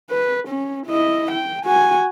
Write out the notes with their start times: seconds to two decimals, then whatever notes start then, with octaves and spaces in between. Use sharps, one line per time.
0.11 B4
0.48 C#4
0.86 E4 D#5
1.32 G5
1.65 F#4 G#5